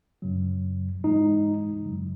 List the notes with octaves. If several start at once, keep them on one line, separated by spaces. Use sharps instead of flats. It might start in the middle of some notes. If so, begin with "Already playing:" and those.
F#2 C#3 F#3
G#2 E3 G#3 D#4
F#2 C#3 F#3